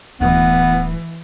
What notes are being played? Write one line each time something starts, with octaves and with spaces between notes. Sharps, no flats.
D1 D3 E3 B3